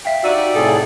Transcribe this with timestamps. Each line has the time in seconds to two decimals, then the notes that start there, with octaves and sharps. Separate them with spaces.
0.05 E5 F5 G5
0.24 D#4 F#4 G4 D5 E6 D#7
0.55 A2 C3 G#4 A4